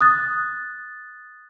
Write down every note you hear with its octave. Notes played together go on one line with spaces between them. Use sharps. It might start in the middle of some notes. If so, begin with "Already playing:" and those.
D#6 F#6 A6